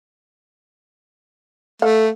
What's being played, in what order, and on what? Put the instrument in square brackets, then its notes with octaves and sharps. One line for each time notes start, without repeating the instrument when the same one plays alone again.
[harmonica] A3 [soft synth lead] A4 [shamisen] F5